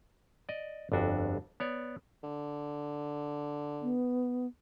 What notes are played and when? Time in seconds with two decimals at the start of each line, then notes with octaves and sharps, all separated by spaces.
0.49 D5 D#5
0.92 G1 F2 D4 F#4
1.60 B3 C#5 D5
2.23 D3
3.82 B3